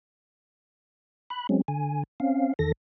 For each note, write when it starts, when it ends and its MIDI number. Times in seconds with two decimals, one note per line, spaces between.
1.30 1.47 83
1.30 1.47 90
1.49 1.62 54
1.49 1.62 56
1.49 1.62 60
1.49 1.62 61
1.68 2.03 50
1.68 2.03 80
2.20 2.54 60
2.20 2.54 61
2.20 2.54 77
2.59 2.72 40
2.59 2.72 51
2.59 2.72 69
2.59 2.72 94